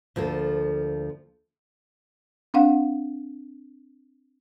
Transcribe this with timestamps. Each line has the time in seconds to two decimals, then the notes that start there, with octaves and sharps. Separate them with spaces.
0.16 D2 F3 A#3 A4
2.54 C4 D4 F5 F#5